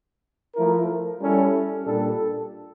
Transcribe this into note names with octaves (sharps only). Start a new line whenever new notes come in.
F3 A3 E4 A#4
G3 C#4 E4 A4
A#2 G3 D4 A4